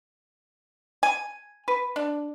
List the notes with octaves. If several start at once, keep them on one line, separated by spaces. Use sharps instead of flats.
G#5
B4
D4